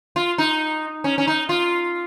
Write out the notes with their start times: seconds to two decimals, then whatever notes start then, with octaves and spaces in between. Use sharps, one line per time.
0.16 F4
0.38 D#4
1.04 C#4
1.18 C#4
1.27 D#4
1.49 F4